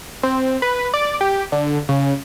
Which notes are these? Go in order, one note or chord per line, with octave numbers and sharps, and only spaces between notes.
C4
B4
D5
G4
D3
C#3